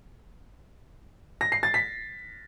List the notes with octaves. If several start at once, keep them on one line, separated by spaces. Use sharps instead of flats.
A#6
C7
A6
B6